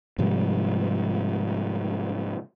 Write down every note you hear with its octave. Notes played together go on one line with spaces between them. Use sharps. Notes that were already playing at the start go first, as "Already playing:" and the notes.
G#2 C3 F3 G3